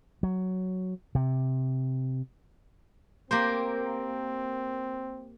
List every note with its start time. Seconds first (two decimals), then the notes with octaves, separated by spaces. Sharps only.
0.23 F#3
1.15 C3
3.31 A#3 C4 G4 C5